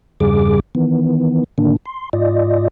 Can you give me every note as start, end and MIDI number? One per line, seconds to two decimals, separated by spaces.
0.20 0.60 40
0.20 0.60 43
0.20 0.60 49
0.20 0.60 55
0.20 0.60 68
0.20 0.60 86
0.75 1.44 51
0.75 1.44 52
0.75 1.44 59
1.58 1.77 45
1.58 1.77 50
1.58 1.77 51
1.58 1.77 58
1.58 1.77 62
1.86 2.09 84
2.13 2.68 44
2.13 2.68 65
2.13 2.68 74
2.13 2.68 75